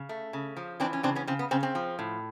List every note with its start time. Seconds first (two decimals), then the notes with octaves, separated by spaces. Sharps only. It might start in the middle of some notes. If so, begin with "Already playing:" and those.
Already playing: C#3
0.09 A3
0.33 C#3
0.57 F3
0.80 E3 C4 D4
0.93 C#4
1.03 C#3 C4 D4
1.15 B3 C#4
1.27 C#3 C4
1.39 B3
1.51 C#3 C4
1.63 C4
1.75 F3
1.99 A2